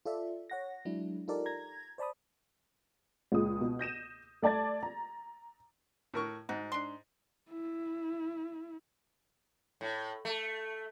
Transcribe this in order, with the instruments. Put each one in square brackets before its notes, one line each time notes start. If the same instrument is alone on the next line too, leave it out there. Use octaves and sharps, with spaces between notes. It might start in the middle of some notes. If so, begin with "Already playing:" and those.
[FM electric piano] F4 A4 D5 E5
C#5 F#5 A#6
F#3 G#3 D4 E4
D#4 F4 G4 A4 A#4 D5
A#5 G#6 A#6
C5 D5 A5 B5 D#6
[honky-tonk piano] C#2 A#2 G#3 D#6
B2
G6 A#6 D#7 E7
A3 D5 A5 G#6 A6
A#5
[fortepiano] A2 A#4 C#6
[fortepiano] G#2 [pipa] F#4
[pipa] D4 C6
[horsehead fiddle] E4
[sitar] A2
A3